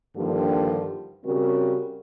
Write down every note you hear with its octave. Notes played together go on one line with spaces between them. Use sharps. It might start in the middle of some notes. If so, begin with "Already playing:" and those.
G2 D3 D#3 F3 A#3 G4
C#3 G3 C4 F#4 A#4